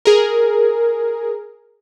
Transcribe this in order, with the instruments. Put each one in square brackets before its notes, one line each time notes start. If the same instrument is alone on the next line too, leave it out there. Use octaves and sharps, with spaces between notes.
[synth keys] G#4 A#4